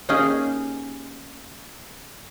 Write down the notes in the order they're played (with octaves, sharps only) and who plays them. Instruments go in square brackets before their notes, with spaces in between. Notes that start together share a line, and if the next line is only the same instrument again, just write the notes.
[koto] A#3 C#4 D#4 G4 G#4